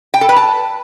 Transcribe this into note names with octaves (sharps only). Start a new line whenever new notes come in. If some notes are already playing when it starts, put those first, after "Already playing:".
G5
A4
B4
A5